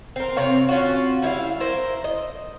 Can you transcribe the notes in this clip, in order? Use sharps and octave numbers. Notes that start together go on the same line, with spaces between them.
C4 A#4
C3 C4 C#5 F5
C#4 F4 F#4
G3 E4 E5 F5
E4 A#4 C5
D#5